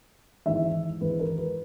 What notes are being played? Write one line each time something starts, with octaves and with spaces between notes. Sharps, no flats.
G#1 G#2 E3 E5
G#1 G#2 E3 B4
A#4
B4